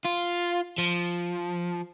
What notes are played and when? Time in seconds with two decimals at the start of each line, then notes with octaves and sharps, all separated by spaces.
0.05 F4
0.78 F3